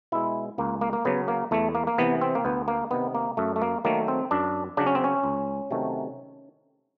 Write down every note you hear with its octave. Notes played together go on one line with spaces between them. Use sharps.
B2 G#3 E4
C#2 A#3
A#3
A#3
C#3 F#3 B3
A#3
E2 A3
A#3
A#3
C3 E3 B3
C4
A#3
D2 B3
A#3
C3 D#3 B3
A#3
F#2 A3
A3
A#3
D#3 F#3 A3 A#3
C4
F#2 D4
C#3 F#3 D4
C#4
C4
C#4
C#2
C3 D#3 F#3 A3